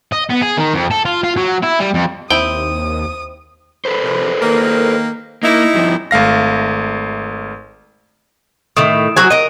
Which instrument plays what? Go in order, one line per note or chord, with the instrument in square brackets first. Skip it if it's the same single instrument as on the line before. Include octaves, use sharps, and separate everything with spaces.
[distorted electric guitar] D#5
B3
G#4
D#3
F2
A4
F4
F4
F#3
E4
G3
F2
[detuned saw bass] D#2 [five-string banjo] C4 E4 [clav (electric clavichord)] G5 [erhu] D#6
[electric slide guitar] A4 B4 C5
[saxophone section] C3 F3
D#3 A#3
[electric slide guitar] A#3 A#4 [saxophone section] D#4 E4
[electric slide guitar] G2 F3
[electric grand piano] G#1 A3 F5 A#6
[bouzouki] A2 D#3 [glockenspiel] D#6 D7 E7
[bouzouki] F#3 F#4 G#5
[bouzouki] A#4 D#5 [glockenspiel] D#7